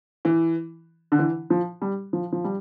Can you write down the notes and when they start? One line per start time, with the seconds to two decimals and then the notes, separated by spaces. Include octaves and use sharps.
0.25 E3
1.12 D3
1.19 E3
1.50 F3
1.82 G3
2.13 F3
2.32 F3
2.44 G3